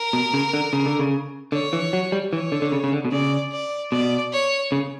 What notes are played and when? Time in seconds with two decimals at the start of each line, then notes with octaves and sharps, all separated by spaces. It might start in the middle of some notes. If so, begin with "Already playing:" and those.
Already playing: A#4
0.13 B2
0.34 C#3
0.54 D3
0.73 C#3
0.86 D3
0.99 C#3
1.52 D3 C#5
1.73 E3
1.93 F#3
2.12 G3
2.33 E3 C#5
2.52 D3
2.62 D3
2.72 C#3
2.84 C#3
2.93 D3
3.05 B2
3.12 C#3 D5
3.52 D5
3.92 B2 D5
4.32 C#5
4.72 C#3